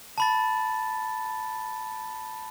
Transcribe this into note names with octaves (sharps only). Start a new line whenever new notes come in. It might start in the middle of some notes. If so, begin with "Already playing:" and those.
A5 B5 A6